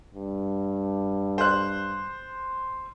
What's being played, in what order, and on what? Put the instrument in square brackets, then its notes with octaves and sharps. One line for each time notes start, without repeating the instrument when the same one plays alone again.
[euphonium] G2
[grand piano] C5 F#6